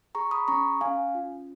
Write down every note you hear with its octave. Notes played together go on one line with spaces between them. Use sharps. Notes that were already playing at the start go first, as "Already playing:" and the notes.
G#4 A#5 C#6
B5 D#6
C#4 A#5 C#6
C#4 F5 G#5
F4